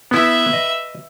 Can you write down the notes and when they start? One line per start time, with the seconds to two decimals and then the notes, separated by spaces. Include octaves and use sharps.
0.11 B3 E4 B4 E5
0.53 D#5